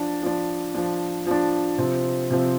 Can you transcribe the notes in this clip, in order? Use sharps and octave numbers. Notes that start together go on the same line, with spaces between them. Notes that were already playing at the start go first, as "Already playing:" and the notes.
Already playing: F3 D4
F3 D4
F3 D4
F3 D4
C3 F3 C4
C3 F3 C4